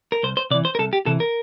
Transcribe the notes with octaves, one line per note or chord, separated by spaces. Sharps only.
A#4
C2 C5
C5
C3 E3 D5
C5
A#4
C2 A4
G4
C3 E3 A4
A#4